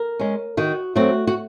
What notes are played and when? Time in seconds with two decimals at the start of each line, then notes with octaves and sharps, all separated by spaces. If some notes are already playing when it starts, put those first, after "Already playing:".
Already playing: A#4
0.19 G#3 C#4
0.57 D#3 F#4
0.96 F#3 A3 C4 F#4
1.27 F#4